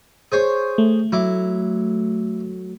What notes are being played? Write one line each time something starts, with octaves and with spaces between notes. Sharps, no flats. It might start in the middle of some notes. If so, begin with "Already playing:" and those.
G#4 C5 C#5
A3
F#3 E4 D6